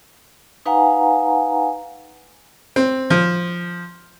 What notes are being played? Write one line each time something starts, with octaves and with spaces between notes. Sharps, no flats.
D#4 B4 F5 F#5 G#5 A#5
C4
F3